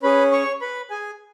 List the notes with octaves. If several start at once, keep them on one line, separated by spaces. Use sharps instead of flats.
C#4 G#4 B4 B5
C#5 C#6
B4 B5
G#4 G#5